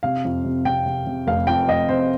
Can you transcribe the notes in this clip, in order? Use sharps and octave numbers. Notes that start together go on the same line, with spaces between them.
C3 F5
F2
C3
C3 G5
C3
C3
F1 F5
F2 G5
F1 D#5
C3 C5